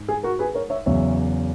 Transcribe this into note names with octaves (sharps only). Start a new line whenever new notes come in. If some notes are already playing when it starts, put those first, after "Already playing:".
Already playing: G#2
G#4
F#4 A#4
G#4 B4
A#4 C#5
C#5 E5
E2 C#3 F#3 B3 C#5 E5